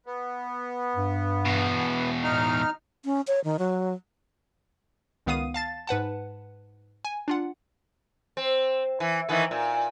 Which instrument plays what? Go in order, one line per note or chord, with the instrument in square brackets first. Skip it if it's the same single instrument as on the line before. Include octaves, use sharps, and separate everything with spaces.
[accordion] B3
[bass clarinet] G2
[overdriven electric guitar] E2 B2
[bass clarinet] A2 [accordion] D#4 F6
[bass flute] C#4
C#5
D#3
F#3
[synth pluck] C#2 D#3 B3 F5 D#6 D#7
F5 A5 A6
G#2 B4 F#5 A5
G#5
D4 F4 F#5
[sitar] C4
E3
D#3 E3 B3
A#2